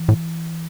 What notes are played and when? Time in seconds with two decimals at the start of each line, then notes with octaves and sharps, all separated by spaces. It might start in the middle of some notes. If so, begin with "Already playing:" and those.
Already playing: E3
0.09 A2